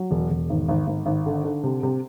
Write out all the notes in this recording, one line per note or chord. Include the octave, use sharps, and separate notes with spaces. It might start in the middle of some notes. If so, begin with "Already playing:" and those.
Already playing: F#3
E1
E1
G#1
G#1
G#1
G#1
D3
D3
C3
C3